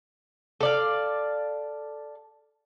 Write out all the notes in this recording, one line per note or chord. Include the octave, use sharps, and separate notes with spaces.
A4 D5 F5